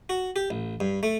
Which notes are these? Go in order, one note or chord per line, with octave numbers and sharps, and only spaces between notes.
F#4
G4
A1
G2
A3